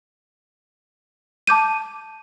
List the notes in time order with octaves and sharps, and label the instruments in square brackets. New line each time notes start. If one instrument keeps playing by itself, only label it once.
[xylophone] A5 D6 G6 D#7